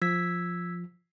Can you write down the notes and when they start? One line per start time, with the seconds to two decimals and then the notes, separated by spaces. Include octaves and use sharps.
0.02 F3 E6 G#6 B6